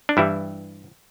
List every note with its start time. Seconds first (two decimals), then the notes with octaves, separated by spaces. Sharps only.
0.09 D4
0.17 G2 E3 G3 E4